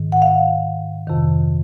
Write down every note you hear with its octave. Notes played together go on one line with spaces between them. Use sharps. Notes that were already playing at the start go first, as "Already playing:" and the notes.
Already playing: G#2 D#3
F#5
F5
F2 C3 D#3